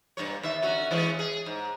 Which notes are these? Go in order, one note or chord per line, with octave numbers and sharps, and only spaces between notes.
G2 A#2 C#5
D#2 E5
D3 C#4 F#4
E3 G#3 C#4
G#4
G#2